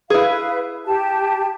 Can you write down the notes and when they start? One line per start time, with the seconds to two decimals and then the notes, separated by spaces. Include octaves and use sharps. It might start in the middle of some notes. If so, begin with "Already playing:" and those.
0.10 E4 G#4 B4 F5
0.86 G4 A5